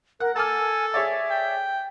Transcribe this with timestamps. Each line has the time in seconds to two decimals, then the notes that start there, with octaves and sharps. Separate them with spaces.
0.20 A#4 F#5
0.36 A4 G#5 A5 D6 F6
0.94 G#4 C#5 D5 E5
1.30 G5